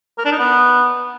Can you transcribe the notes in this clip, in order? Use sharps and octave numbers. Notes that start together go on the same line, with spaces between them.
A#4
D4
D#4
B3